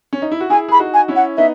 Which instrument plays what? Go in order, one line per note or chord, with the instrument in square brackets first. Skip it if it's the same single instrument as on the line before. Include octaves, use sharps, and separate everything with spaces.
[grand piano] C#4
D#4
E4
F#4
[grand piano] E4 G#4 [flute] G#5
[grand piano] G#4 [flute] B5
[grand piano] D#4 F#4
[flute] G#5
[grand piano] C#4 E4
[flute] F#5
[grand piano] B3 D#4 [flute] E5